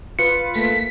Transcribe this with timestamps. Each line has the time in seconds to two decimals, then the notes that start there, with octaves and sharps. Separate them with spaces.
0.19 F4 B4 C#7
0.55 A3 A#3 B6